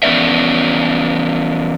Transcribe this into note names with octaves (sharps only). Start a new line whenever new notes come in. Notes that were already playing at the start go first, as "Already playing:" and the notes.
E3 B3 C#4 D5 E5